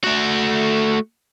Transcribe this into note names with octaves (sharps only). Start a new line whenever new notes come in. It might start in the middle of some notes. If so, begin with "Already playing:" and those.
A3 F#4